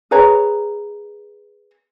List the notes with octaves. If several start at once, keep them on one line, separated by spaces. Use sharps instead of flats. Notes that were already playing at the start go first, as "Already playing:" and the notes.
G#4 B4 C#5 A#5